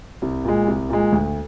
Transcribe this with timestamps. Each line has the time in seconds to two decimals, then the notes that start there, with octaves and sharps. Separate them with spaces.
0.22 C2
0.45 A#2 G#3
0.67 C2
0.89 A#2 G#3
1.12 D2